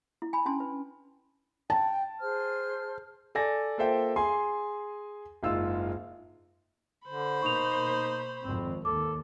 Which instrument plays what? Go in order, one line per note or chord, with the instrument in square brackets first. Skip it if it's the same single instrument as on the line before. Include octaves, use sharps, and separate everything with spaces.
[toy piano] E4
G#5 B5
C#4 D4 A5 C6
B4
[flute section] G5 [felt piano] A5
[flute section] G#4 C5 F6
[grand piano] A4 D5 G#5 A#6
A#3 F4 A4 C5 E5 G5
G#4 G#5 C6
F#1 G#2 F4 E6
[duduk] D3 [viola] C5 B5
[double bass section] B2 A#3 [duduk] D#4 [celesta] C#6 F7
[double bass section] G#1 F2 [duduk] C4
[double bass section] D#2 [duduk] A4 [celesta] D6